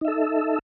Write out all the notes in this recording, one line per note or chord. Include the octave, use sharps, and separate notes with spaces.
D#4 A4 E5